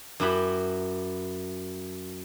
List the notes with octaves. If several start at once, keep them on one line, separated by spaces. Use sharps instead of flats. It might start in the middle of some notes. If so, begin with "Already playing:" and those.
F#2 E4 F#4 G4 B5